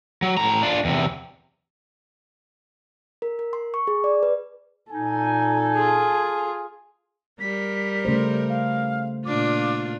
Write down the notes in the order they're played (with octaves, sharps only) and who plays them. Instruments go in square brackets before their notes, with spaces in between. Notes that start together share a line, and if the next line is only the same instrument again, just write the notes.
[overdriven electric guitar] F#3
A2 A#5
D4 F4
E2 C3
[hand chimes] A#4
A#4
C6
C#6
G#4
D5
B4
[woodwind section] A#2 D#4 [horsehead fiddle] A4 [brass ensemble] G#5
[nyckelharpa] F4 G#4
[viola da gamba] G3 A#4 [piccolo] B6
[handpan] C#3 A3 C5
[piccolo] F5
[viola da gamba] A#2 D4 F4 [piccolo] D6